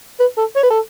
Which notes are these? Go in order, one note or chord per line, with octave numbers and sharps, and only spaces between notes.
B4
A4
C#5
B4
A4